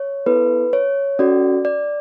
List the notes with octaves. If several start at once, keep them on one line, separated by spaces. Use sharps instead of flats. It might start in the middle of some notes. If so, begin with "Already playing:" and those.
Already playing: C#5
B3 E4 A4 B4
C#5
C#4 F#4 A4 D5
D5